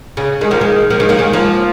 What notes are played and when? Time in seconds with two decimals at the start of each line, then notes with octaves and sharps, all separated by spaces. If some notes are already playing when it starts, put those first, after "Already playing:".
0.17 C#3
0.41 D#3 G#3
0.51 F3 A#3
0.61 D#3 G#3
0.90 F3 A#3
1.00 D#3 G#3
1.09 F3 A#3
1.19 D#3 G#3
1.33 F3 A#3